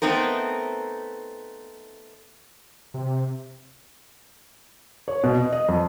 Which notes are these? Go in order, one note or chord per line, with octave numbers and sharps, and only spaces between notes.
A3 B3 C4 D#4 A#4
C3
C#5
B2
D#5
D#5
F2